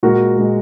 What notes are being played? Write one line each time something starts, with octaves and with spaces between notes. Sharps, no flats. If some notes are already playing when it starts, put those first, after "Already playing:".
A#2 G#3 F#4 A#4
A#2 G#3